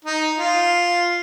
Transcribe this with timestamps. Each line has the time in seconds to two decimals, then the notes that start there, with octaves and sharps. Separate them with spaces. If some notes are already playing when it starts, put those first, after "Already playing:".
0.05 D#4
0.37 F4